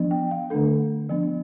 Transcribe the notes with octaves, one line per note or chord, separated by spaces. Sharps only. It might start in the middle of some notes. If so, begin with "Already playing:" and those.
Already playing: F3 B3 D4
G5
F5
D3 A3 D4 A4
F3 B3 D4